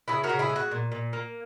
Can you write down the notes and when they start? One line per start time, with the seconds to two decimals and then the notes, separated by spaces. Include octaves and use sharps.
0.08 C#3 E4 G#4
0.23 F#4 A#4
0.29 C#3
0.39 E4 G#4
0.49 G#3
0.56 F#4
0.71 A#2
0.92 A#2
1.13 A#3